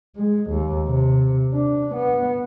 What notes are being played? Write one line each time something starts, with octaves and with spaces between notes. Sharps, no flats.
G#3
D#2
C3
D4
B3